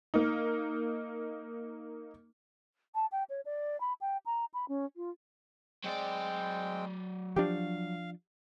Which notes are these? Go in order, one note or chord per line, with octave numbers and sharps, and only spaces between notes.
A#3 D#4
A5
G5
C#5
D5
B5
G5
A#5
B5
C#4
F4
F#3 G#3 C4 D5 G5
F3 D4 G4 F5